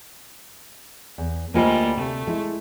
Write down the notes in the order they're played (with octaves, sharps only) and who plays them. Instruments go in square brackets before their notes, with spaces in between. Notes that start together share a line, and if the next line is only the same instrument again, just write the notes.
[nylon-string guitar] E2
[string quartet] D2 G3 G#3 [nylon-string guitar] A#3 F4 C5
[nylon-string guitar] C3 [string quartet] A3
[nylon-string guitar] G#3 E4